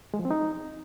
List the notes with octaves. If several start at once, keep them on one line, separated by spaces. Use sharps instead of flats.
G#3
F3
C4
D#4